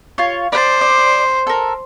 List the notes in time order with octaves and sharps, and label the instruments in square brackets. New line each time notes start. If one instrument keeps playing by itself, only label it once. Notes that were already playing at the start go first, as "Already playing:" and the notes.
[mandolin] F4 C#5
[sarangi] C5 [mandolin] D5 F#5 A5
[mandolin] D5
A4 A#4